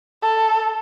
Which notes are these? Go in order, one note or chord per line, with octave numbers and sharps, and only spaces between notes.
A4